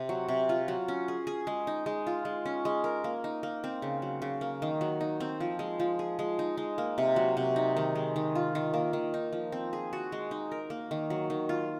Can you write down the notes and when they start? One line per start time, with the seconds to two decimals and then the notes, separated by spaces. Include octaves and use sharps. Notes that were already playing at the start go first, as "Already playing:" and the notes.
Already playing: C3 C4
0.09 F#3
0.28 C3
0.49 F4
0.68 F#3
0.88 C#4
1.08 G#4
1.27 G#4
1.47 G#3
1.67 D#4
1.86 G#3
2.07 F4
2.25 G#3
2.45 C#4
2.65 G#3
2.84 A#4
3.04 A#3
3.24 D#4
3.43 A#3
3.64 C4
3.82 C#3
4.02 F#3
4.22 C#3
4.41 A#3
4.62 D#3
4.81 F#3
5.01 D#4
5.20 C4
5.40 F3
5.59 G#3
5.80 F3
5.99 G#4
6.19 G#3
6.39 D#4
6.57 G#3
6.78 A#3
6.98 C3
7.16 F#3
7.37 C3
7.56 D#4
7.76 D#3
7.95 G#3
8.16 D#3
8.35 F4
8.55 D#3
8.74 A#3
8.93 D#3
9.14 D#4
9.32 F3
9.52 C4
9.73 G#4
9.93 F#4
10.12 G#3
10.31 D#4
10.52 A#4
10.70 A#3
10.91 D#3
11.10 F#3
11.30 D#3
11.49 F4